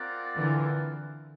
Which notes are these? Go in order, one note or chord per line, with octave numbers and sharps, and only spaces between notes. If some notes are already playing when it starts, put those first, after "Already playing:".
Already playing: C4 F4 A#4 D5 F#5
D3 E3